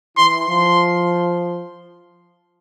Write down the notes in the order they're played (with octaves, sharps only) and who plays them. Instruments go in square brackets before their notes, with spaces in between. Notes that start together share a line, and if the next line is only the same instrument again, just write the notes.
[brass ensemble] E3 [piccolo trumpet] C6
[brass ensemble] F3 [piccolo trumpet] C6